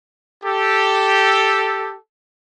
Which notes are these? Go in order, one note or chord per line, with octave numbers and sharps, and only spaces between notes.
G4 A4